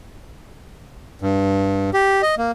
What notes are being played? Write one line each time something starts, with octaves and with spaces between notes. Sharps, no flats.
G2
G4
D#5
A#3